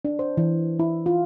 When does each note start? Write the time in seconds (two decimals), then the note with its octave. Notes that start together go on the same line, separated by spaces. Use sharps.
0.05 D4
0.19 C5
0.37 E3
0.79 E4
1.06 F4